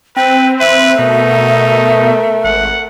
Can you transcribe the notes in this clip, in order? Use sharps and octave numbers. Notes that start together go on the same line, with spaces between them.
C4 B4 G5
B4 E5
B2 A3 D#4 A#4
G#1 F#5